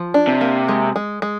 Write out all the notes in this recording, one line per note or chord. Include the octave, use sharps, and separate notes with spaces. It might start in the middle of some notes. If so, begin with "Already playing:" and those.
Already playing: F3
D4
C3
A#3
G#3
G#3
G#3